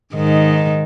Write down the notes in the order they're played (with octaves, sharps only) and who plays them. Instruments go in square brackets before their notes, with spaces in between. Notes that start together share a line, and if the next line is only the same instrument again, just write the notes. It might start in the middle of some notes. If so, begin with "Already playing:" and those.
[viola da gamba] G#2 D#3